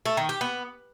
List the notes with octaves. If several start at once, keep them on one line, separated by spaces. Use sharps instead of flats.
A3
D#3
G4
B3